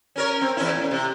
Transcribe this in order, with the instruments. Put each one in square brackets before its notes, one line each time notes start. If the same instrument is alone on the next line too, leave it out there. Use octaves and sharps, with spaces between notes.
[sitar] C#4 A#4 C#5
C4
E2 C#4 E4
A2
C3